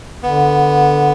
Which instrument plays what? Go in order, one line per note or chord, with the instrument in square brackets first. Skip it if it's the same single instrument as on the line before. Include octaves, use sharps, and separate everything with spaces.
[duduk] D3 [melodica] B3